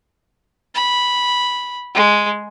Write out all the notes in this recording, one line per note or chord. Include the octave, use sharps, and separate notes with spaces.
B5
G#3